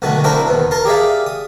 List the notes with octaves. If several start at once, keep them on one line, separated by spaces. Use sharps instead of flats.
B1 D3 D#3 A3 F#4
C4 D4 E4 F#4 A#4 C5
D#2 B2
A#4 A5 C6
G4 G#4 D5 E5 F5
D#6